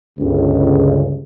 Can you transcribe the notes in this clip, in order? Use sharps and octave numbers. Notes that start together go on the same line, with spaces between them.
G1 C#2